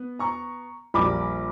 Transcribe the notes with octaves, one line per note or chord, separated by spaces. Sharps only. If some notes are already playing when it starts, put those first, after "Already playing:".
Already playing: B3
A#5 C#6
A#1 A#2 G3 B5 D6